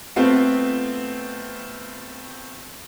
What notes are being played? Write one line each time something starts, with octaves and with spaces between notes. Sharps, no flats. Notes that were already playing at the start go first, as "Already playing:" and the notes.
A3 B3 C4 F4